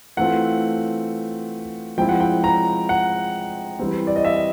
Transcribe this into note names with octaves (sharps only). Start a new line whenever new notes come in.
E3 A3 C4 F4 F#5
F3 G#3 C4 E4 G5
F#5
G5
A#5
F#5
E3 G3 C4
D5
D#5
E5